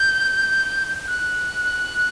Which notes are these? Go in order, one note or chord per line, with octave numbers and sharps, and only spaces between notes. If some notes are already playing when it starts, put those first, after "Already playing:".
Already playing: G6
F#6